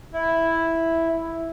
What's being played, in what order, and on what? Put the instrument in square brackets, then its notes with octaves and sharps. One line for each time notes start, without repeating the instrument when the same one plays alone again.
[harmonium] E4